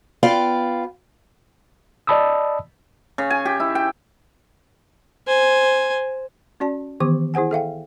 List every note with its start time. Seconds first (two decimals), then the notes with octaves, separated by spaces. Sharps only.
0.23 B3 F4 D5 F5 G5
2.07 D5 D#5 A5 B5 D#6 E6
3.18 C#3
3.30 G#5
3.45 G4
3.60 E4
3.75 G5
5.27 C5 G#5
6.60 C#4 F#4 D5 A5
7.00 D#3 E3 B3 G4 D6
7.34 E4 G#4 C5 F#5 G#5
7.51 A4 E5 F5 G5